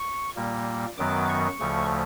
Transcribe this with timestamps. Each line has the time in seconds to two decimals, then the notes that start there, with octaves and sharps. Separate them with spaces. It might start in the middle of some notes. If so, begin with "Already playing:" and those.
Already playing: C#6
0.36 A#2 G3 A#3
0.98 F#2 D#3 F#3 B3 D6
1.29 C#6
1.60 D2 C#3 F3 A3